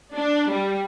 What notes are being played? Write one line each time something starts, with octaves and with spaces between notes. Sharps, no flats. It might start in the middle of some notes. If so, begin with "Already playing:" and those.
D4
G3